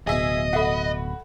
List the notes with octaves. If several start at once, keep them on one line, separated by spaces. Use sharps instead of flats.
D1 B2 G#4 D#5 E5
F#4 A4 E5 F#5 B5